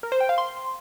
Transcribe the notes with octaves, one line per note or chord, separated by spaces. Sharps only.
A#4
C5
G5
F5
C6